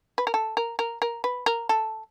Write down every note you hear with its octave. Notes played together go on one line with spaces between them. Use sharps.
B4
A#4
A4
A#4
A#4
A#4
B4
A#4
A4